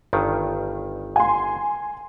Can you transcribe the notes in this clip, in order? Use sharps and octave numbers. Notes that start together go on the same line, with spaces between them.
G1 G2 D#3
G#5 C6